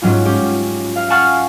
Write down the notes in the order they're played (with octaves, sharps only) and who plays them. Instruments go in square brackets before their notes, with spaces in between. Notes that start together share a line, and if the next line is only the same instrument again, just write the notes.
[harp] G#2 F#3 C#4 F4
C#4 G4
F5
F5 F#5 G#5 A5 C#6 F6